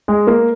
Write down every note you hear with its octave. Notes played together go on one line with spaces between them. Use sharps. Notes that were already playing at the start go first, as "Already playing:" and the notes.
G#3
A#3